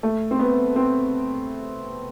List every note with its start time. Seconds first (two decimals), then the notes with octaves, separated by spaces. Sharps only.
0.03 A3
0.31 C4
0.39 B3
0.76 C4